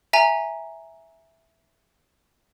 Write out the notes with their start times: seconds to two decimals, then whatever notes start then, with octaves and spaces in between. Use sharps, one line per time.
0.13 E5 G#5 A#5